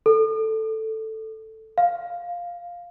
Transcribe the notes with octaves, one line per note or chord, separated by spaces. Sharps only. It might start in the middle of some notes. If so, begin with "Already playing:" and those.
A4
F5